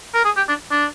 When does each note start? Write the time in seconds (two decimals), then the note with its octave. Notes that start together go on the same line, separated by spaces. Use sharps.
0.14 A#4
0.25 G#4
0.37 G4
0.48 D4
0.71 D4